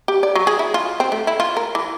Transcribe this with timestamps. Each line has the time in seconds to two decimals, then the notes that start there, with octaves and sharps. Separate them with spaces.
0.08 G4
0.23 D5
0.36 F#3
0.47 G#4
0.59 E4
0.74 F4
1.00 C4
1.12 A3
1.27 E4
1.40 F4
1.57 A#4
1.75 E3